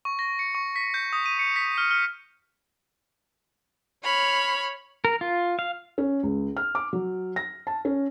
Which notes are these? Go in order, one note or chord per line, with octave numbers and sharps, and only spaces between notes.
C#6
A#6
C#7
C#6
B6
G6
D#6
D#7
C#7
B6
F6
F6
C#5 B5 F6
A#4
F4
F5
C#4
C#2
F6
D6
F#3
A#6
A5
C#4